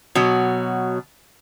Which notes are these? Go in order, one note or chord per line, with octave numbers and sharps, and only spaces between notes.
B2 F#3